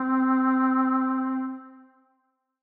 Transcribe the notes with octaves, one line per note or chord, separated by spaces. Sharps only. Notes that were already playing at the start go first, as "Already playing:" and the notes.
Already playing: C4